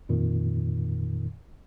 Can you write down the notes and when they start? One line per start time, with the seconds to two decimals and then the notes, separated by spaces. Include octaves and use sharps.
0.09 F2 A#2 D#3